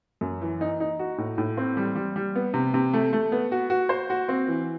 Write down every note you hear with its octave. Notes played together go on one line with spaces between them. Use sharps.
F#2
E3
D#4
D#4
F#4
A2
A2
C4
G3
G3
G3
B3
C3
C3
A3
A3
B3
F#4
F#4
C5
F#4
C4
E3